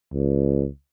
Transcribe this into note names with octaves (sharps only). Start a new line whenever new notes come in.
C#2